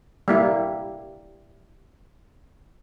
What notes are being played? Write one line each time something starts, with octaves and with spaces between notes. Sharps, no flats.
G3 A#3 E4